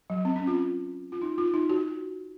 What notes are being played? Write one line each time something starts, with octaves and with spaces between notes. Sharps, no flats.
F#3
C4
C#4
F4
F4
D#4
F4
D#4
F#4